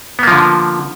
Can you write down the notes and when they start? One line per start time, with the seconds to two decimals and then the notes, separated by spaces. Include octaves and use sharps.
0.19 B3
0.23 A#3
0.27 F3
0.32 D3